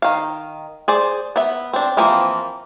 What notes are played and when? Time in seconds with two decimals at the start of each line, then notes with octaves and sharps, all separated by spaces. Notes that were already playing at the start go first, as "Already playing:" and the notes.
0.02 D#3 F5
0.88 G#4 C5 D5
1.36 B3 E5
1.73 C4 D4
1.97 E3 F3 A#3 C4